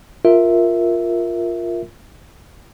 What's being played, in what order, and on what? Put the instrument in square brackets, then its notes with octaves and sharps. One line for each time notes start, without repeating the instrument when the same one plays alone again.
[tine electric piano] F4 A#4 E5